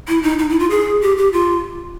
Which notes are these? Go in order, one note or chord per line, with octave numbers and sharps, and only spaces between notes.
E4
D#4
D#4
E4
F4
G#4
G4
G4
F4